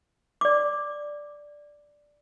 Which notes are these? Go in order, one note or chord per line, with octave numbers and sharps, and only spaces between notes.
D5 D6